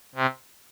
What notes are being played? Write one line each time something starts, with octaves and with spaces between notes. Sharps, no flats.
C3